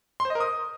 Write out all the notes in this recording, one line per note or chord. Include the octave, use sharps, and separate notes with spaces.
C6
C5
D#5
A#4
D#6